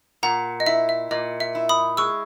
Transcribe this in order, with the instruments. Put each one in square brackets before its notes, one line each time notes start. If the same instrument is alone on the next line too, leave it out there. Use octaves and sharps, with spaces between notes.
[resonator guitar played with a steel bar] A#2 [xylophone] F#5 A#5
[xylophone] D#5
[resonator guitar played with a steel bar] E4 [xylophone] E5
[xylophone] E5
[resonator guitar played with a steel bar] A#2 [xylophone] D#5
[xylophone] E5
[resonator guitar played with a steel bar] E4
[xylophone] B5 D#6
[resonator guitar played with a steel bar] G#3 [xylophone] C#6 E6